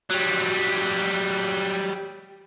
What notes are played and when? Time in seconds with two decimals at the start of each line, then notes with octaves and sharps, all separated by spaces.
0.11 F#3 G3